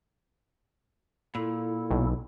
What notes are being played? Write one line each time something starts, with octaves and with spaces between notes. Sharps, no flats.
A#2 E4 A4
B1